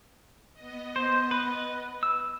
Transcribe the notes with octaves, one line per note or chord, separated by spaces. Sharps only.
B3 D#5
C5
B4
E6